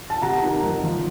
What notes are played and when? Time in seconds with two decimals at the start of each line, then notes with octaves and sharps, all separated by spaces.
0.10 A5
0.22 C3 F#5 A#5
0.43 D#3
0.63 F#1
0.83 F3